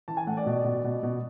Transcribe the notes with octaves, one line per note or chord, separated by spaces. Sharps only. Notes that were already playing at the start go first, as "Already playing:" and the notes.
E3 A5
G#5
A2 F#5
D5
B2
D5
B2
B2
B2